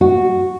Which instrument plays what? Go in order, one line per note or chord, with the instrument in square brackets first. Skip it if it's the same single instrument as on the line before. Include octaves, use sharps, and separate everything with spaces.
[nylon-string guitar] F#4